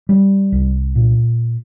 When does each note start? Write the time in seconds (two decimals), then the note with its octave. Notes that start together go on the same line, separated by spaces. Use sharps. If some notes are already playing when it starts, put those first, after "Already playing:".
0.09 G3
0.52 C2
0.95 A#2